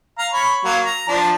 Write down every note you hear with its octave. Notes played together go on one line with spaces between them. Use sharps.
F5 A#5
C#5 B5
F#3 A#3
A#5
F3 D4